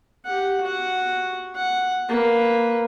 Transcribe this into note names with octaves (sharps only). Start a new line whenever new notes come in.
G4 F#5
F#4 F#5
F#5
A#3 B4